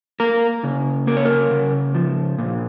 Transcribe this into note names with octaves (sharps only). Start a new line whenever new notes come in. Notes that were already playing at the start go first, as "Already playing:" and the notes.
A#3 A#4
C#3
A#3 A#4
C#5
A#4
C#3
F3
A#2